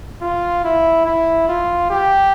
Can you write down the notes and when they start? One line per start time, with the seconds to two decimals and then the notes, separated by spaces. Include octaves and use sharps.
0.22 F4
0.64 E4
1.06 E4
1.49 F4
1.90 G4